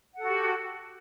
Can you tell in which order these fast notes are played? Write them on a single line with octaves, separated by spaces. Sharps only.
F#5 A4 F#4 G4